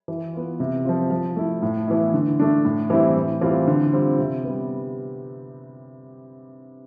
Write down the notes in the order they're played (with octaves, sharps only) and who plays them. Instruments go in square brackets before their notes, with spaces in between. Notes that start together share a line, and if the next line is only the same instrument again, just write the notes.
[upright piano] E3
B3 F4
C3
F3 C4 F4
F3
A3 E4
A2
E3 B3 E4
D3
A3 D4
A2
E3 G3 C4 E4
A2
E3 G3 C4 F4
D3
G3 C4 F4
C3
G3 B3